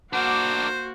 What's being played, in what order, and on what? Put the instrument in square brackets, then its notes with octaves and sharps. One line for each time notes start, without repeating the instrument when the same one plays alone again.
[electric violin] A#3 F#4 [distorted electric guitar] D4 A#4 [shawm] C5 [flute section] F#5 D6